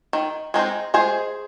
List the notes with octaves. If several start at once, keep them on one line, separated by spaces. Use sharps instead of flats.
D#3
G#3 C4 D#4
G#3 G#4 C5